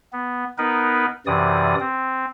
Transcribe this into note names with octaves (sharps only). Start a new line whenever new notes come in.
B3
B3 D#4 A#4 B4
F#2 C3 E3 D5 D#6
C4